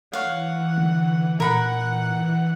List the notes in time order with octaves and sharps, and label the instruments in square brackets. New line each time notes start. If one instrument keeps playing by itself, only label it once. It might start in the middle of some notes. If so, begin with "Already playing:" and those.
[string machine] E3 [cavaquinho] C#5 F5 [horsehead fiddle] F#5
[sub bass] D3
[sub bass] A#2 [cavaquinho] A#4 B5 [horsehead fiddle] F#5
[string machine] E3